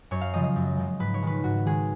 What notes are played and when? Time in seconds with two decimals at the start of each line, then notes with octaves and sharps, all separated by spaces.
0.11 F#2 C#5
0.21 F5
0.33 C#3 F3 G#3 D#5
0.44 D#5
0.56 F#2
0.77 C#3 F3 G#3
1.00 G#2 B4
1.14 C#5
1.22 D#3 G#3 B4
1.44 G#2 F#4
1.66 D#3 G#3 G#4